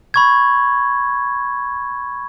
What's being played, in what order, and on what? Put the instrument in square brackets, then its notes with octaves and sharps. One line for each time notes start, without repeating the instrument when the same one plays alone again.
[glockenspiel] B5 C#6 G#6